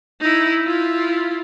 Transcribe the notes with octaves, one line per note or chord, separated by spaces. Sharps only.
D#4 E4
E4 F4